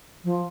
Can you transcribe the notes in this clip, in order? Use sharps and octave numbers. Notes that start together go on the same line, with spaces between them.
F3